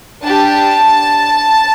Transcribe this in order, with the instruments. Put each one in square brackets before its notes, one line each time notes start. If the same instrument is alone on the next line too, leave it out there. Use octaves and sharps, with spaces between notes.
[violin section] D4 G4 A5